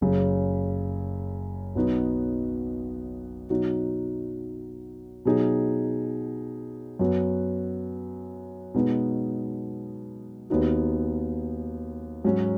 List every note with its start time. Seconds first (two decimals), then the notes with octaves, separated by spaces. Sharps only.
0.01 F#1 F#2 C#3
1.75 B1 B2 B3 D#4 F#4
3.50 B2 F#3 D#4 F#4
5.25 B2 F#3 D#4 G#4
6.99 F#2 F#3 B3 F#4
8.74 B2 G#3 B3 D#4 F#4
10.50 D#2 D#3 B3 D#4 F#4
12.24 G#2 F#3 C#4 F#4